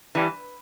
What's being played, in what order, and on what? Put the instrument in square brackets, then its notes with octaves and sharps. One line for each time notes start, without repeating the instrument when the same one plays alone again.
[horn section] G2 G3 [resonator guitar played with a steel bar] E3